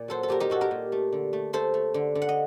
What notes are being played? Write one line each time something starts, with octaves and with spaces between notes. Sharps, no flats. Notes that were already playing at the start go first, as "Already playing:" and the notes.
Already playing: A#2 D5
F#3 A4 C5
A4
A#2 G4 A#4
D#4 G4
A#2 F#4 A4
G4 A#4
A#2
A3
D3
A3
A3 A4 C5
A3
D3
D3
F#5
D#5